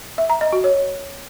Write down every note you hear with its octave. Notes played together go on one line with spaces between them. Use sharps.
E5
A#5
D#5
F#4
C#5